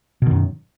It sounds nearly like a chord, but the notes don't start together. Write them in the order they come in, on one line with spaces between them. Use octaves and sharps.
B2 D#3 F#2